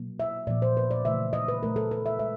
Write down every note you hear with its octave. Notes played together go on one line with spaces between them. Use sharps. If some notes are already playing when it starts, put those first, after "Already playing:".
Already playing: B2 F#3 A#3
E5
A#2 F3 A#3 D5
C5
B4
D5
C#3 E3 A3 E5
D#5
B4
A#2 F#3 A3 A#4
A4
B4
E5
G#3 E5